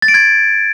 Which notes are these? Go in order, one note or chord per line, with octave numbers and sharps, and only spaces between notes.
A6
D7
G#6